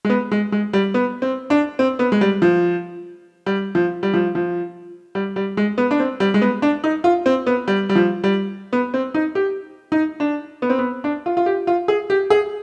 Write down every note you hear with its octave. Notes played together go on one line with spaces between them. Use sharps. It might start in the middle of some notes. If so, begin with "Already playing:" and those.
G#3
B3
G#3
G#3
G3
B3
C4
D4
C4
B3
G#3
G3
F3
G3
F3
G3
F3
F3
G3
G3
G#3
B3
D4
C4
G3
G#3
B3
D4
D#4
F4
C4
B3
G3
G3
F3
G3
B3
C4
D#4
G4
D#4
D4
B3
C4
B3
D4
F4
F4
G4
F4
G#4
G4
G#4